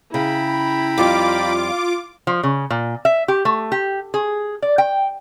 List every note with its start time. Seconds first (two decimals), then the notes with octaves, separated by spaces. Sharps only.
0.14 C#3 E4 G5 A#5 B5
0.98 F2 G3 F4 D6
2.27 F3
2.43 C#3
2.70 A#2
3.05 E5
3.28 G4
3.45 A3
3.72 G4
4.14 G#4
4.62 D5
4.78 G5